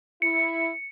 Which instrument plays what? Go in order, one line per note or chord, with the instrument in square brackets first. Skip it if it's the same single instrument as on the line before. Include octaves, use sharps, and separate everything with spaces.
[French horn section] E4 [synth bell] C#7